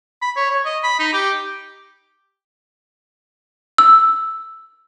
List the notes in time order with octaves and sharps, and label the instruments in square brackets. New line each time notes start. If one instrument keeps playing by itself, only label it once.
[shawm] B5
C#5
C#5
D#5
B5
D#4
G4
[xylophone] E6